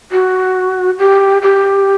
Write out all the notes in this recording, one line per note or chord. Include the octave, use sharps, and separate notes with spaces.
F#4
G4
G4